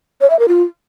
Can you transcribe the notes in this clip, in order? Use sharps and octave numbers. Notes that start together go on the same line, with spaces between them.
C#5
E5
A#4
F4